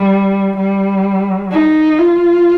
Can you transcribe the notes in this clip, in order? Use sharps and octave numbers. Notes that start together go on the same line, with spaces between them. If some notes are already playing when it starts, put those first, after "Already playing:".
Already playing: G3
G3
D#4
F4